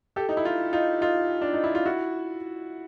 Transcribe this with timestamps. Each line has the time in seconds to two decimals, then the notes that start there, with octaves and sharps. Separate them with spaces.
0.16 G4 A4
0.29 D#4
0.37 E4
0.45 D#4 F4
0.73 D#4 F4
1.01 D#4 F4
1.42 D4
1.53 D#4
1.64 E4
1.75 F4
1.86 E4 F#4